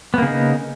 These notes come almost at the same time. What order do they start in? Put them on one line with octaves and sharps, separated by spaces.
B3 A#3 C#3 D#4